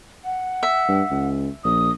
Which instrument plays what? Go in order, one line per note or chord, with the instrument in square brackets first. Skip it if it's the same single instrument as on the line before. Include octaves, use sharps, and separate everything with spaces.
[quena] F#5
[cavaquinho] E5
[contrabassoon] G2
C#2
[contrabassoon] A#1 [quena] D#6